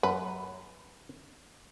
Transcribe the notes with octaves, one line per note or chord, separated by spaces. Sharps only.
F#2 B4